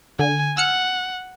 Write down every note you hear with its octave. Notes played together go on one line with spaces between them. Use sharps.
D3 G#5
F#5 E6 F6 C#7